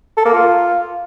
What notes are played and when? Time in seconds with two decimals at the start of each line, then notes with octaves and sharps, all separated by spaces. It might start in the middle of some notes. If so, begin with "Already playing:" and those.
0.17 A4
0.25 A#3
0.33 F4